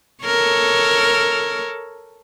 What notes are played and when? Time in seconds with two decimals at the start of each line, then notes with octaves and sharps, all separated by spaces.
0.24 A4 A#4 C#5